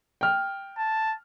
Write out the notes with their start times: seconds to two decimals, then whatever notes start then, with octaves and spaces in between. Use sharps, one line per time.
0.21 G5 F6
0.78 A5